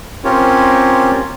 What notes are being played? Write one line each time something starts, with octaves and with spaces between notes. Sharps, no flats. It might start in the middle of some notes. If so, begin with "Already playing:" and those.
C4 C#4 F4 G4 A#4 C#5